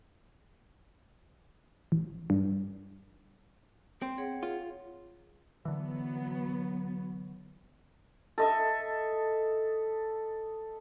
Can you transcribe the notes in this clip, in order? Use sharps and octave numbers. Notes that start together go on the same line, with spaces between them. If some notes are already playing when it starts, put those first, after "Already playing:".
A1
G2
C4 C6
G#4 C#5 F#5
F4
D3 E3 F#3 B3
A4 D#5 E5